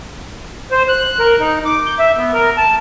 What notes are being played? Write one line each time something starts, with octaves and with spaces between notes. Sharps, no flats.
C5
F#6
A#4
D#4
D6
G6
E5
B3
A#4
A5